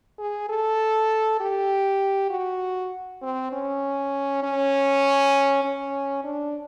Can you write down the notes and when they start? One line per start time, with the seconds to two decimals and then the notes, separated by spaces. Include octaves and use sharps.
0.19 G#4
0.49 A4
1.41 G4
2.30 F#4
3.22 C4
3.53 C#4
4.43 C#4
5.64 C#4
6.24 D4